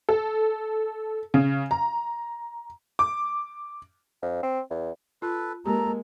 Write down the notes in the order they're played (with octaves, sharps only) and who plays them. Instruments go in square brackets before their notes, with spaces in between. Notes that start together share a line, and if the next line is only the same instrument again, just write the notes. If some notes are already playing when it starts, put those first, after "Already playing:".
[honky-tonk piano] A4
C#3
A#5
D6
[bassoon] F2
C4
E2
[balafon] F4 [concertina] A4 B4
[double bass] G#3 A#3 [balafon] G4 [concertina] A4 [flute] A#5